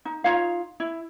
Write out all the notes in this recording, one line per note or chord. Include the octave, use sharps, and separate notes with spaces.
D#4
D#4 F4 C#5 F5
E4